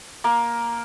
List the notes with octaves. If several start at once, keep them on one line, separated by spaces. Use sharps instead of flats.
A#3